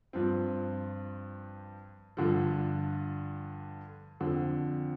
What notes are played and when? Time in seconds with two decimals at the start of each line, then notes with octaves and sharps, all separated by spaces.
0.13 G2 F3 C4
2.17 G2 D3 F3
4.20 F2 D3 F3